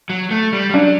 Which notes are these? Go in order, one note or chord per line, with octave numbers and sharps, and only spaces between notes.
F#3
A3
G3
G3
F#3 D4